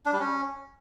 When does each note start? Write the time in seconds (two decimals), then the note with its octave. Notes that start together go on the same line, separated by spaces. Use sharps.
0.06 D4
0.13 G3
0.20 C#4